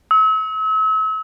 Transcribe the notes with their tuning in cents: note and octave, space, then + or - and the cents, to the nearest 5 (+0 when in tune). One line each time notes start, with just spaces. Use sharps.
E6 -40